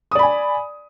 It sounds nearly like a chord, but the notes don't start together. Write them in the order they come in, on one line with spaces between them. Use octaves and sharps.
D#6 D5 B5 G#5